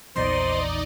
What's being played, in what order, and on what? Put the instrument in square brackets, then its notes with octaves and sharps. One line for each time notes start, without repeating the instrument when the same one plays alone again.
[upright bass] A#1 E2 [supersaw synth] D#4 D5 D#5 [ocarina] C5 [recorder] C6